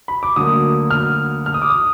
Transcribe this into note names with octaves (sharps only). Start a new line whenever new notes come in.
B5
D6
D2 D3 F#3 A#3 D#6
F6
F6
D#6
D6
D#6